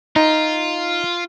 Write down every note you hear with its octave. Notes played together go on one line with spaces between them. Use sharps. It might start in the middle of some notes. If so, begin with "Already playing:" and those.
D#4 F4